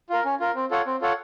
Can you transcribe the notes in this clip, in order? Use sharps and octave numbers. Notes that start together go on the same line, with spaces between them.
F4 A#4
C#4
F4 A#4
C4
F4 A4 C#5 F#5
C4
F4 A4 C#5 F#5